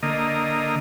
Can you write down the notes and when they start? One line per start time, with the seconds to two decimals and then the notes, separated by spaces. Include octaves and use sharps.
0.03 D3 A#3 D#5